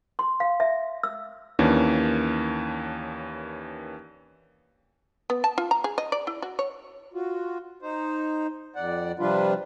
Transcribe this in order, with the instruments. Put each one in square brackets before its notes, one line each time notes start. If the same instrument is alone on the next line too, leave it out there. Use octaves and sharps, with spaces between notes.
[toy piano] C6
F5
E5
E6
[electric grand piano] D#2 E3 A#3 C#4 D4
[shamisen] B3
A5
F4
A#5
G#4
D#5
D5
E4
F#4
C#5
[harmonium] F4 F#4
D#4 C5
F2 D5 F#5
C3 F3 G3 D4 F4 B4